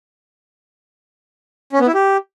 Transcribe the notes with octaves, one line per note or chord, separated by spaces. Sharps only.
C#4
B3
E4
G4